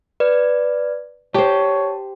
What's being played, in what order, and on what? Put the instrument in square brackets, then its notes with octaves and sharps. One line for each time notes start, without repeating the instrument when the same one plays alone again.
[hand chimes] B4 D5
[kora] G4 C5 [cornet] C#5 [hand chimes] A5